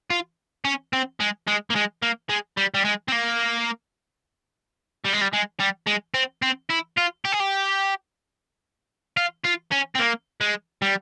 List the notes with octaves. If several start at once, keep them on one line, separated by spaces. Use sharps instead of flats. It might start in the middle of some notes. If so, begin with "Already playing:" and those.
F4
C#4
C4
G#3
G#3
A#3
G#3
A#3
G#3
G3
G3
G#3
C4
A#3
G3
G#3
G3
G#3
G3
G#3
C4
C4
E4
F4
G4
G#4
G4
F4
F4
C#4
C4
A#3
G#3
G3